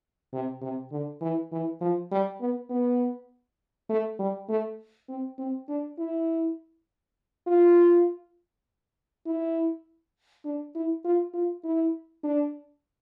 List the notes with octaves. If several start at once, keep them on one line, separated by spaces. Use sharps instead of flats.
C3
C3
D3
E3
E3
F3
G3
B3
B3
A3
G3
A3
C4
C4
D4
E4
F4
E4
D4
E4
F4
F4
E4
D4